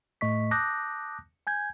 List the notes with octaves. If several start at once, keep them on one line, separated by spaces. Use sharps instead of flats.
A2 A3 D#5 C#6 B6
A5 D6 D#6 F#6 G6 A#6
G#5 G6 G#6